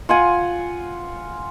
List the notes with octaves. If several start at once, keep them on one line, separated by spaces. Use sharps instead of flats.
F4 F#5 G#5